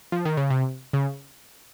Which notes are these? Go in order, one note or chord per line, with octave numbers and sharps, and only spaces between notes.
F3
D#3
C#3
C3
C#3